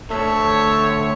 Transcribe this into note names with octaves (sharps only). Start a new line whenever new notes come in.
D2 C4 A4 C#5 E5